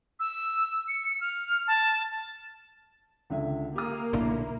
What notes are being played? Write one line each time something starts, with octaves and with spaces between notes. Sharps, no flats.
E6
C#7
F6
A5
C#2 D3 E5
A#3 G4 D#6
B1 A#2 D3 E4